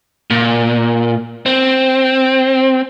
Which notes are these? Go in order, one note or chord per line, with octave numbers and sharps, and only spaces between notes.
A#2
C4